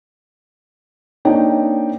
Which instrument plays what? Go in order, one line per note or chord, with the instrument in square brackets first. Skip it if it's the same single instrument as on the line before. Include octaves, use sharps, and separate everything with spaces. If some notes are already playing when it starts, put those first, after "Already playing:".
[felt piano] A#3 C4 D4 D#4 C#5 G5